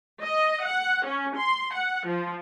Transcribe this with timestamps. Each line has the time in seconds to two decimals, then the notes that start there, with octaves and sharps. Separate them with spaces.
0.22 D#5
0.65 F#5
1.06 C#4
1.36 C6
1.75 F#5
2.07 F3